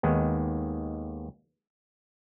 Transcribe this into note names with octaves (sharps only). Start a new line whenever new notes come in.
D#2 D#3 G#3 B3